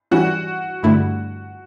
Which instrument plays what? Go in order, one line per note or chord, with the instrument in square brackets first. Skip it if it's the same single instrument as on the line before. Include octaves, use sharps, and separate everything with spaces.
[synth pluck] E3 G3 C#4 [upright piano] F#4
[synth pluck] G2 D3 A3 E4